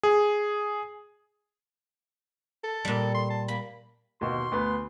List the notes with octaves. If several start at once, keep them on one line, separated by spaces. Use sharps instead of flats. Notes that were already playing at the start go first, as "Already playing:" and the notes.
G#4
A4
A#2 G3
C6
A5
A#3 B5
D#2 B2 C6
D2 B3 B4